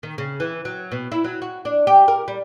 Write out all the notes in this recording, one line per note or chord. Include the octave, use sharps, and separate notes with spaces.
D#3
C#3
E3
F#3
B2
E4
F#3
F#4
D4
G4
A#4
G3